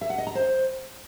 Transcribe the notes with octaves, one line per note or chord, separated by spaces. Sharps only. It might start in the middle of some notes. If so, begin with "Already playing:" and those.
E5
F#5
D#5
A#5
C5